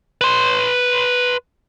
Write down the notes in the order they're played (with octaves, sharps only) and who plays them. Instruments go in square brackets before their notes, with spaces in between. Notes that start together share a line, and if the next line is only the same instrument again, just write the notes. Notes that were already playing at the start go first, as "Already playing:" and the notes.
[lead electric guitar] B4 C6